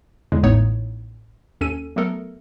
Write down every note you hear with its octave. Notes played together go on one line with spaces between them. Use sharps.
E2 A2 D3 G#3
A1 A2 A3 B3 D#4 C#5
D#2 C#4 A4 D#7
F#3 A3 B3 A4 A#4